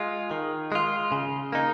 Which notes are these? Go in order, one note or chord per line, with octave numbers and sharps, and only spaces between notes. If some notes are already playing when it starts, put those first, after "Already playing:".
Already playing: G#3 F4
D#3
G#3 F4
C#3
A#3 D#4